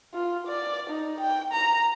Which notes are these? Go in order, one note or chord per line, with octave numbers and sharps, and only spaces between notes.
F4
D5
D#4
G5
A#5